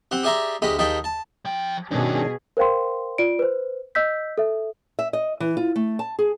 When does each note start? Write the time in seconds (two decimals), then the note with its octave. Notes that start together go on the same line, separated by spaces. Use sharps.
0.11 C4 G4 F#5
0.23 G4 G#4 D5 E5 A#5 C6
0.62 D2 G#3 G4 D#5 B5
0.79 D#2 D#4 G#4 G5 A5 B5
1.04 A5
1.45 F3 G5
1.91 G2 B2 D#3 C#4 D4 G#4
2.57 A#4 C5 F5 G5 C6
3.18 F4 D5 D7
3.39 B4 C5
3.95 D#5 E6 G6 B6
4.38 A4 E5
4.99 E5
5.13 D#5
5.40 E3
5.57 F4
5.76 A3
5.99 A5
6.19 G#4